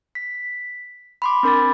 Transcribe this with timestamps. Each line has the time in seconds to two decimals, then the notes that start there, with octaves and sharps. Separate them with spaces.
0.15 B6
1.22 B5 C6 D6
1.43 C4 D4 A#4 B5 D6 A6